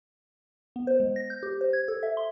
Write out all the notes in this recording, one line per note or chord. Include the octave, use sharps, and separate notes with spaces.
B3
C5
G#3
A#6
G6
G4
C5
G#6
A4
E5
C6